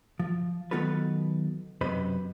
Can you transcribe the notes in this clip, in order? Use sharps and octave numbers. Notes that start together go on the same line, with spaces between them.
F3
D#3 F#3 B3 F4 A4 B4
F#2 C3 B4 C5 D#5 B5